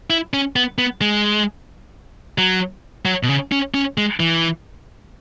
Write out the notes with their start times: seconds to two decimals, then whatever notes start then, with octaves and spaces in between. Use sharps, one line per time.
0.10 E4
0.34 C#4
0.56 B3
0.78 B3
1.01 G#3
2.38 F#3
3.05 F#3
3.23 B2
3.29 C#3
3.52 C#4
3.74 C#4
3.98 G#3
4.20 E3